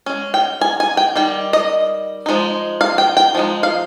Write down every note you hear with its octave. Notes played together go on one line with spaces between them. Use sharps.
G#3 C#4
G5
G#5
G#5
G5
D#3 G3 G5
D#5
F3 G#3 D#4
F5
G5
G5
F3 G#3 D#4
F5